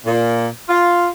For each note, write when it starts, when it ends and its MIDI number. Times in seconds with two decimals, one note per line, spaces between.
0.06 0.47 46
0.69 1.08 65